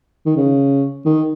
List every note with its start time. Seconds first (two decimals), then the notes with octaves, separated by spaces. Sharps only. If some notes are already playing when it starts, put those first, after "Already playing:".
0.26 D#3
0.37 C#3
1.05 D#3